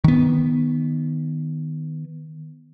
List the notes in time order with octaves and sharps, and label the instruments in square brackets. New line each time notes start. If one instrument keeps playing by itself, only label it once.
[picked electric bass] D#3 B3